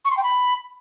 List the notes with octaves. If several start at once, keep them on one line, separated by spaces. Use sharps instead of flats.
C#6
C6
G5
B5